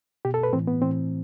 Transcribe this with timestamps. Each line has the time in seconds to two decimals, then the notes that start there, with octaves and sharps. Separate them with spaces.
0.25 B2 G4
0.34 A4
0.43 B4
0.53 A2 E3 C4
0.67 B3
0.82 A2 E3 C4